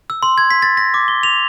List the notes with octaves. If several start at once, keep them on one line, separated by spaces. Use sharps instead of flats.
E6
C6
G#6
B6
A6
A#6
D6
G7
F7